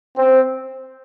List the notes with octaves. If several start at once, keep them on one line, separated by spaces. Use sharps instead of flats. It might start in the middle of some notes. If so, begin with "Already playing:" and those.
C4